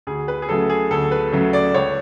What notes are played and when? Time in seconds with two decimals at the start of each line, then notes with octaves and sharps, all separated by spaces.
0.07 D2 G#4
0.28 B4
0.42 G#4
0.49 C#3 F#3 A3 A4
0.70 G#4
0.91 D2 A4
1.11 B4
1.32 C#3 F#3 A3
1.53 D5
1.74 C#2 C#5